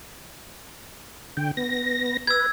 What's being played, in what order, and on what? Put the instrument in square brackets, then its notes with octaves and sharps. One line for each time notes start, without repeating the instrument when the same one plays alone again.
[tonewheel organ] D3 G5
B3 A#6
[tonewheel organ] B4 [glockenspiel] E6 G#6